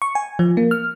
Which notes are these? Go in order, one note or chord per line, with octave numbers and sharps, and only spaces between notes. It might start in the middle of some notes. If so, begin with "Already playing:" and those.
C#6
G#5
F3
A#3
F6